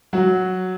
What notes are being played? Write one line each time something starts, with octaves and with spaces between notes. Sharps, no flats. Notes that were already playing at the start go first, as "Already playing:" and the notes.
F#3 F#4